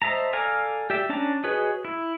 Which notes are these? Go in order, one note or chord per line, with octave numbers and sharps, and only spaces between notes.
C5 D#5 E5 A5 A#5
A4 D5 F5 G#5 A#5
G4 D5 E5
C#4 D4 A5 A#5
F#4 G#4 B4 C#5 D#5
E4